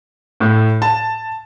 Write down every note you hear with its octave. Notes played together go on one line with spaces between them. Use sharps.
A2
A5